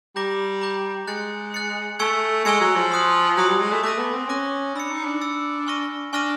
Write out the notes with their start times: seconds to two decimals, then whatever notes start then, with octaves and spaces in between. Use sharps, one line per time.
0.16 G3 A#5 D6 G6 A#6
0.62 A#5 D6 G6 A#6
1.07 G#3 F#6 A6 C#7
1.54 F#6 A6 C#7
1.99 A3 G#5 C#6 E6 G#6 C#7
2.45 G#3 G#5 C#6 E6 G#6 C#7
2.61 F#3
2.76 F3
2.92 C6 D#6 F#6
3.37 F#3 C6 D#6 F#6
3.49 G3
3.60 G#3
3.72 A3
3.83 A3 D6 F#6 A#6 D#7
3.98 B3
4.14 C4
4.29 C#4 D6 F#6 A#6 D#7
4.75 D4 B5 E6 A6 C#7
4.90 D#4
5.06 D4
5.21 B5 E6 A6 C#7
5.67 G#5 C#6 F6 A#6 D#7
6.13 D4 G#5 C#6 F6 A#6 D#7